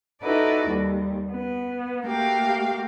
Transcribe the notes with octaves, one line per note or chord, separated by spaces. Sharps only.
D#4 E4 F#4 A4 B4 D5
D#2 G3
B3
A3 A#3 F#4 G4 F5 G5